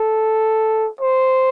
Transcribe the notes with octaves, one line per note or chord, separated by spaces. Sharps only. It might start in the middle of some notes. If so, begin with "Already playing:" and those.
Already playing: A4
C5